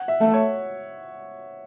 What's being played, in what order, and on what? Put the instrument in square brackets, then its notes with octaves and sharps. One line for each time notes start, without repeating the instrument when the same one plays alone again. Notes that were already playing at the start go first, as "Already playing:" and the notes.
Already playing: [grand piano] F#5
E5
[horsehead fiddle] A3
[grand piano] C#5